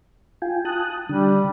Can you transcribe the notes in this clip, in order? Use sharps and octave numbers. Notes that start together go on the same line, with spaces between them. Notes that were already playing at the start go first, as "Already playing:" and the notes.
F4 G5 G#5
A5 D#6 F#6
D3 G3